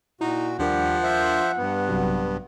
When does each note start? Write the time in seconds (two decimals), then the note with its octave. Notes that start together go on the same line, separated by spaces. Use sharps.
0.21 A#2 D#4 E4 F#4
0.59 D#2 F3 G3 D4 G4 A#4 F#5
1.03 C5 E5
1.57 G2 B3
1.89 A#1 C3 F#3